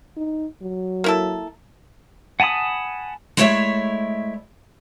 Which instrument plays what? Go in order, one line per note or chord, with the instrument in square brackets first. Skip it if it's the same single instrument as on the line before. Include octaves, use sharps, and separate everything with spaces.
[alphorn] D#4
F#3
[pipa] A#3 E4 A4
[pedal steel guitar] F#5 G#5 A5 B5 D#6
[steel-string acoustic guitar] G#3 A3 E4 C#5 D5 E5